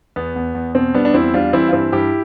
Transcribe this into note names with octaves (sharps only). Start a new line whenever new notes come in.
E2 B3
E2
E2
B2 C4
G3 B3 D4
D4
E2 C4 E4
G3 D4 F4
E3 C4 E4
F4
G2 C4 E4
G2 E4 G4